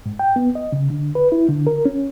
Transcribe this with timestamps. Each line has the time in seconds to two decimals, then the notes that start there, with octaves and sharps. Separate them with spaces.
0.06 G#2
0.19 G5
0.36 B3
0.55 D#5
0.72 C#3
0.90 D3
1.15 B4
1.32 E4
1.49 D3
1.67 A#4
1.85 C#4